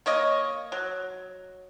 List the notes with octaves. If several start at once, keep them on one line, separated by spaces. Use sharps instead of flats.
A#3 C#5 D#5
F#3